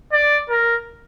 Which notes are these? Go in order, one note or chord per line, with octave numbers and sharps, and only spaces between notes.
D5
A#4